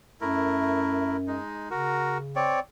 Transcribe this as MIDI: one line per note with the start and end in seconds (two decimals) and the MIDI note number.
0.21 1.39 42
0.21 1.17 57
0.21 1.17 64
0.21 1.17 70
1.27 1.69 56
1.27 1.69 63
1.71 2.57 49
1.71 2.18 66
1.71 2.18 70
2.36 2.59 60
2.36 2.59 73
2.36 2.59 74